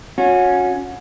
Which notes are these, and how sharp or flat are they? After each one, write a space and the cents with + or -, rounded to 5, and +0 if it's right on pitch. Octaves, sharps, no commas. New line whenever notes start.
C#4 +0 F#4 -30